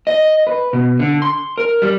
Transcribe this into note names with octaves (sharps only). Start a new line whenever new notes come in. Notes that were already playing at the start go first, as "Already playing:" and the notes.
D#5
B4
B2
D3
C6
A#4
G3